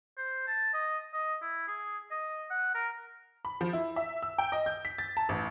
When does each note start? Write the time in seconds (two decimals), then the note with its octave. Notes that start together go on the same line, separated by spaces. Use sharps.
0.18 C5
0.48 A5
0.73 D#5
1.14 D#5
1.42 E4
1.68 G#4
2.11 D#5
2.50 F#5
2.74 A#4
3.45 B5
3.61 F3
3.73 E4
3.96 E5
4.22 E6
4.38 G5
4.52 D#5
4.66 G6
4.85 B6
4.98 A6
5.17 A5
5.29 A1